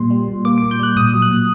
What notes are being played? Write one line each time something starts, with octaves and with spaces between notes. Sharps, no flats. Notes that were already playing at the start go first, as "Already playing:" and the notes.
Already playing: A#2 G3 C6
G3
A#2
A#3 D6
A#2 D6
G6
G3 F#6
A#2 D#6
F#3
F#6
A#2